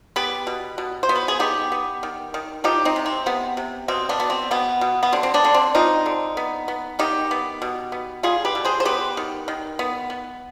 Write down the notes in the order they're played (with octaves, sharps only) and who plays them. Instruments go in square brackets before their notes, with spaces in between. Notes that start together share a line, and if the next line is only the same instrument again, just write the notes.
[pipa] B3 G4 B4
B2
B2
C5
B3
B4
G#4
B3 D#4 G4
B3
D#3
D#3
F3 D#4 G4
C4 D#4
C3
C4
C3 B3
C3
B2 C4
B3 D4
B3
C4
B2 B3
B2
B3
D3 C4
C4
B3 D4
D3
C4
F3 C4 D#4
D3
B3
B3
D#3 D#4 G4
B3
B2
B3
G3 F4 G#4
G4 B4
B2
G#4 C5
C5
B3 G4 B4
D#3
D#3
B3
B3